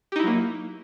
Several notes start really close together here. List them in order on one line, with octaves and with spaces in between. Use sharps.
G4 D#4 E4 F#3 A#3